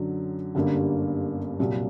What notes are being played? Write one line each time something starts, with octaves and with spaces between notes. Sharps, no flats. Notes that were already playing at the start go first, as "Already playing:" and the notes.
Already playing: F#2 D3 F#3
G1 F#2 D3 G3 A#3
C2 A#2 F#3